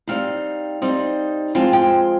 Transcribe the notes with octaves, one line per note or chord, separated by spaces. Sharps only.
G3 C4 D#4 F5
G3 C4 D#4
F3 G#3 C4 F4 G5
G5